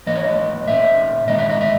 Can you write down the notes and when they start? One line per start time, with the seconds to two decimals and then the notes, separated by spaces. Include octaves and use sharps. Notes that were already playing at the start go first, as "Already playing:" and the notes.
0.07 G#2 E3 A#3 D#5
0.15 C#5
0.24 D#5
0.67 A#2 A#3 C#4 E5
1.27 G#2 D#3 G#3 D#5
1.39 E5
1.49 D#5
1.61 E5